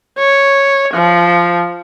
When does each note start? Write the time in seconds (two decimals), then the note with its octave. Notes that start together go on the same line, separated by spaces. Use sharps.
0.18 C#5
0.93 F3